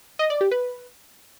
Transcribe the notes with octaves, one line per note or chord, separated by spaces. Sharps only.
D#5
D5
G4
B4